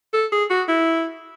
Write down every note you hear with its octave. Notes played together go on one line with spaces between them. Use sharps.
A4
G#4
F#4
E4